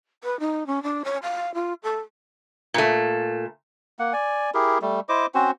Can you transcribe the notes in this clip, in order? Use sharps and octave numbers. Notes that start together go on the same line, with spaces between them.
B4
D#4
C#4
D4
C#5
F5
F4
A4
A#2 A3
A#3 F#5
D5 G#5
E4 G4 G#4 A#4
G3 A3
E4 C5 D#5 D6
C4 C#4 F#4 C5